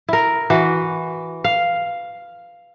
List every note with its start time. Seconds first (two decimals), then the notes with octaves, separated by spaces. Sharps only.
0.08 E4 A#4
0.50 E3 F#4
1.44 F5